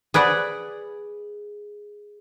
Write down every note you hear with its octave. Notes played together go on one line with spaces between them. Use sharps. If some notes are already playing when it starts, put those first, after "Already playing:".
G#4 B4 D5 F#5